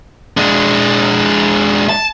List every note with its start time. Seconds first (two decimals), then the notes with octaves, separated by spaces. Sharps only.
0.37 G#3 D4
1.89 A5